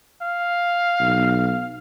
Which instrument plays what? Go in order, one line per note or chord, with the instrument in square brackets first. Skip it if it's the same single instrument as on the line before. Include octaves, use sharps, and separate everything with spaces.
[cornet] F5
[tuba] B1